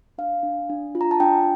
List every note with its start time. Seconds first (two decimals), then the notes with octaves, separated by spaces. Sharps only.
0.18 D4 F5
0.43 D4
0.69 D4
0.95 F4
1.01 A#5
1.11 A5
1.20 D4 G5